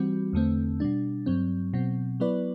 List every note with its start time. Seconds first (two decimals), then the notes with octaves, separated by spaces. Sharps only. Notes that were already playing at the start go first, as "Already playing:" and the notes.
Already playing: E3 G3 C4 F#4
0.33 E2 D3 A3 C4
0.80 B2 G3 D4
1.26 G2 F#3 C4
1.73 B2 F#3 C4
2.20 F#3 B3 E4 B4 D5